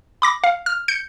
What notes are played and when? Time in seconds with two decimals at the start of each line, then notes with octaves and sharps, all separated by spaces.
0.22 B5 D6 A#6
0.44 F5
0.66 F6
0.88 G6 C#7